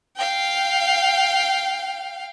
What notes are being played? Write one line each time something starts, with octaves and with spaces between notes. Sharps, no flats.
F5 G5